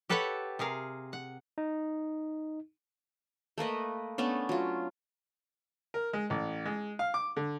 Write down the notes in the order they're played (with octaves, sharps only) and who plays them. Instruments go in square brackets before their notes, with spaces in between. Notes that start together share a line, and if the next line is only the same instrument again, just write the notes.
[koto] G4 A4 B4 C#5 E5 F#5
C3 G#4 A#4 F5
F#5
[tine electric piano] D#4
[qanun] A3 A#3 B4 D#5
A3 B3 C#4 D4
F#3 F4
[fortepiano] A#4
G#3
A1
G#3
F5
D6
D3